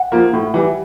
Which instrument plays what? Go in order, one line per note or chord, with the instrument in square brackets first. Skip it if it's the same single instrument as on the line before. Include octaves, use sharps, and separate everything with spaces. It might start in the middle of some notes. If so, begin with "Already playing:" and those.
Already playing: [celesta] F#5
[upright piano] F3 A#3
A2
E3 G3